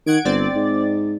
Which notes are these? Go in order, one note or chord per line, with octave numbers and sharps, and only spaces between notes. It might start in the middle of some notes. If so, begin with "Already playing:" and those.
D#3 F#5 G#6 D7
G1 C4 D5 A6
G#2